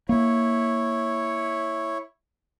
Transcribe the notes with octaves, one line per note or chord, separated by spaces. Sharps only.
A#3 E4 C#5